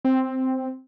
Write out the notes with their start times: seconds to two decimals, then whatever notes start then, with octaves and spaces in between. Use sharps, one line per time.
0.05 C4